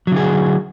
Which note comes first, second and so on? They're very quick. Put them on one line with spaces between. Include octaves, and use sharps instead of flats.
F#3 D3 G#4